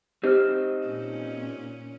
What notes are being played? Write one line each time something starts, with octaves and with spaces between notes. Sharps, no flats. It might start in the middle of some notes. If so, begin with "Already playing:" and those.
C4 D#4 G4 C5 F6
A#2 C#4